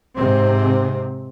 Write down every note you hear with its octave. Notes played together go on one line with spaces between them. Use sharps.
G#2 C3 C4